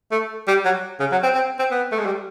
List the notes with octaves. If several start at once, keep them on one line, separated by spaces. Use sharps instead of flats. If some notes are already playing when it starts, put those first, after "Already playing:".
A3
G3
F#3
C#3
F#3
C4
C4
C4
B3
A3
G#3
G3